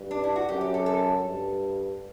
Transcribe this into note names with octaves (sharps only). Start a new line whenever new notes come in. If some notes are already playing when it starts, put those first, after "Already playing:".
Already playing: G2
D4
E4
F#4
F#2 G4
G4
A4
A4
G2